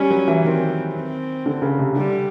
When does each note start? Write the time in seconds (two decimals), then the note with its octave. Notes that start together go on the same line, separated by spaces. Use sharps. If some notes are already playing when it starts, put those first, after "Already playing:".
Already playing: G3 C#4
0.10 F#3
0.28 E3
0.44 D#3 C4
0.95 C4
1.46 D3
1.62 C#3
1.79 C3
1.96 D3 G3